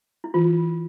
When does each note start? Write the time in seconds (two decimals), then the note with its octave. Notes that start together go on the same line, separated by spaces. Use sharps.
0.24 E4
0.34 E3 F4